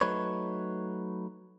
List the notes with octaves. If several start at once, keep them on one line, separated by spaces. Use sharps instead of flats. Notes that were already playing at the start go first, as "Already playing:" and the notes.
F#3 A3 D#4 B4 C#5